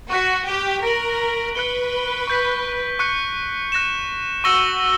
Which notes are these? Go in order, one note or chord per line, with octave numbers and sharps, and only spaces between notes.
F#4 C#6 F#6 B6
G4
A#4 A#6 D7 F#7
B4 F#6 C#7 G7
C#6 G6 B6
C#6 F#6 C#7
F#6 A#6 E7
F#4 C#6 E6 A#6 C#7 G7